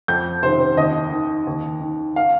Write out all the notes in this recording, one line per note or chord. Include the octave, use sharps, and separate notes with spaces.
F2 G6
C3 D#3 C5
C5
D#2 D#5
D#3
D#2
D#3
F5